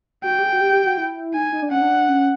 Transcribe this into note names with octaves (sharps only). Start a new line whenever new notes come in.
F#4 G5
G4
G#4
F#4
G4
G4
F#4
E4
D#4 G#5
D#4
D4
C#4 F#5
D4
C#4